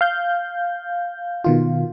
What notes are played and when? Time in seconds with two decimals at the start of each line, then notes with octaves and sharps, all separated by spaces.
0.01 F5 G6
1.44 B2 D#3 F4